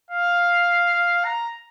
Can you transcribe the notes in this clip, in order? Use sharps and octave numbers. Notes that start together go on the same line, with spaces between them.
F5
A#5